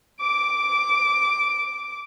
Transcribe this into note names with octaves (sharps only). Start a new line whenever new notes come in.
D6 D7